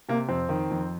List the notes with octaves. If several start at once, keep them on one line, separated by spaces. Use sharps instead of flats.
C3 A#3
F2 C4
D#3
F2